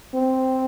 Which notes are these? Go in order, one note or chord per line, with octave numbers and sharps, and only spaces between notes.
C4